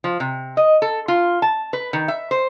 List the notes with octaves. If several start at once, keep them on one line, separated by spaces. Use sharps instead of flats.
F3
C3
D#5
A4
F4
A5
B4
D#3
E5
C5